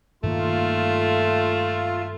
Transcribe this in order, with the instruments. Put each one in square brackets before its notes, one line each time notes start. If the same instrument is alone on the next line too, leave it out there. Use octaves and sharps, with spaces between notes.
[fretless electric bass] G2 D#3 A#3 [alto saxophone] A3 [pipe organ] F4